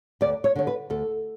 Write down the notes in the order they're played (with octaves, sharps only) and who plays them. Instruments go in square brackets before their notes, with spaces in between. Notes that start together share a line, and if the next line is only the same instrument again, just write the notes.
[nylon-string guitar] D2 D5
C#5
D3 C#5
B4
D2 A4